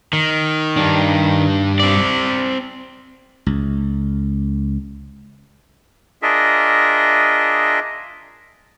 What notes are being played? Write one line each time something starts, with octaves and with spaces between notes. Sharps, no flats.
D#3
G2 D4
C4 D5
C#2
D4 F4 G#4 A#4 D#5 E5